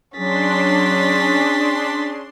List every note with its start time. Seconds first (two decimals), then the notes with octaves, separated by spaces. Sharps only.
0.18 F#3 C#4 D4 G#4 C6 A6 B6